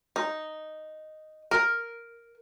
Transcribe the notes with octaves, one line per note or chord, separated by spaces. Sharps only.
D#4
A#4